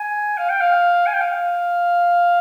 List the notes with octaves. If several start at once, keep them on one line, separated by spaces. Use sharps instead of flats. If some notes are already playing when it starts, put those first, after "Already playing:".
Already playing: G#5
F5
G5
F5
G#5
G5
F5